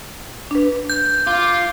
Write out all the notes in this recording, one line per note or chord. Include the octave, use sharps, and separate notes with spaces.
D4 B4
G6
F4 D6